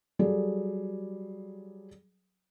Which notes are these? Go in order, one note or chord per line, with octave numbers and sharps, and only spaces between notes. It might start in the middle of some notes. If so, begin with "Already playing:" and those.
F#3 G3 G#4 A4 D5